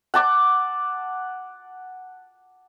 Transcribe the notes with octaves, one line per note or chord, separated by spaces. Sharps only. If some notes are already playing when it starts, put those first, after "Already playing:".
F#5 A5 D6